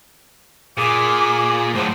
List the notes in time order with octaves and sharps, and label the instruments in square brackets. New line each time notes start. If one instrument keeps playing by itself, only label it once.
[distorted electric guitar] A#2 [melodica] G#4 [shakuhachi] D6
[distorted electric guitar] A2 F#3 [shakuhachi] C5